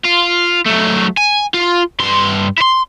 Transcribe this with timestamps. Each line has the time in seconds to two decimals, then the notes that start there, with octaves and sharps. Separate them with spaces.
0.04 F4
0.66 F#3 A3
1.17 G#5
1.54 F4
2.00 G2 C6
2.58 E4 C6